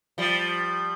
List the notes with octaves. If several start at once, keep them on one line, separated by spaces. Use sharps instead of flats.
F3 G3